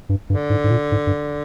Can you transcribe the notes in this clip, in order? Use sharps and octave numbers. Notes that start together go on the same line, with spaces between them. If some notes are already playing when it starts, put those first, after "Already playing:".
G2
G2 D3
G#2
G#2
A#2
G#2
G2